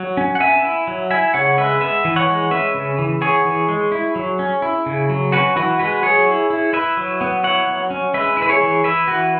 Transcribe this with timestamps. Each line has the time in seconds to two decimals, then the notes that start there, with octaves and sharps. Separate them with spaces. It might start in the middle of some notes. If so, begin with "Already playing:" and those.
Already playing: F#3
0.17 C#4
0.35 F#5
0.40 B3 E5 G#5
0.65 E4
0.88 F#3
1.11 E4 E5 G#5
1.34 C#3 C#5 F#5
1.58 G#3 B4 E5
1.81 B3 B4 E5
2.05 E3
2.16 C#5 F#5
2.28 G#3
2.51 C#4 B4 E5
2.75 C#3
2.99 E3
3.21 B3 G#4 C#5
3.45 E3
3.68 G#3
3.92 E4
4.16 F#3
4.39 C#4
4.62 E4
4.86 C#3
5.09 F#3
5.32 C#4 F#4 B4
5.56 E3 F#4 B4
5.79 G#3 F#4 B4
6.03 F#3 G#4 C#5
6.27 E4
6.50 E4
6.73 E4 B4 E5
6.97 F#3
7.21 B3
7.43 E4 C#5 F#5
7.67 F#3
7.90 C#4
8.14 G#3 B4 E5
8.37 E4
8.42 B4
8.49 G#4 C#5
8.60 E3
8.84 E4 B4 E5
9.08 E3 F#4 B4